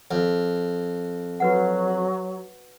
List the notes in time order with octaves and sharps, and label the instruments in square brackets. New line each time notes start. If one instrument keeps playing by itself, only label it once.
[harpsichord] F2
[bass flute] F#3 [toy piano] F#4 B4 F#5